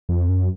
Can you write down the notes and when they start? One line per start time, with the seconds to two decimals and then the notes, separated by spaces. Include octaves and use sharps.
0.09 F2
0.29 F#2